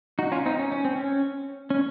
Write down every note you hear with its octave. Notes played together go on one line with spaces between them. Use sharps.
D#4 F#4
C#4 F4
C4 D#4
C#4
C#4
C4
C#4
C#4